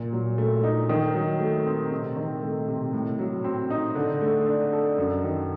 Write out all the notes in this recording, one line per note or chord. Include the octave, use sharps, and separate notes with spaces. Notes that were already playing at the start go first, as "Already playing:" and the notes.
Already playing: A#2
F#3
A3
D#4
D#3
F#3
A3
C4
C3
D#3
A3
C3
A2
F#3
C4
D#4
D3
A3
D4
A4
F#2
D#3